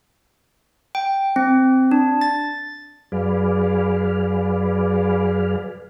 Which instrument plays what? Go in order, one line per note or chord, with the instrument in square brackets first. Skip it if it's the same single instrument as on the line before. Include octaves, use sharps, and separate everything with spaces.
[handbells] G5
C4
D4
A6
[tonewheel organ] F#2 F#3 G#4 B4 D5 F5